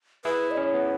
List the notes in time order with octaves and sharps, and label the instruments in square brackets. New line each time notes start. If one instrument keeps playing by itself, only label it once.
[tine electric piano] E4 G#4 [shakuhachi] B4
[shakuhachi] D#5
[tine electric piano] C#4 [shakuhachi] C#5
[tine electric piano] B3